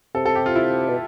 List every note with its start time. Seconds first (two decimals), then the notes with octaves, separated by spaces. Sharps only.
0.15 C3 A4
0.26 A4
0.35 G4
0.46 F4
0.56 E4
0.88 B2